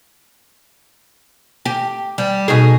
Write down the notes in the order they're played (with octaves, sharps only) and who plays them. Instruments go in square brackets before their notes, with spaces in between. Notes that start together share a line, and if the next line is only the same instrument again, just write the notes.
[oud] G4
G3
B2 D#4 G#4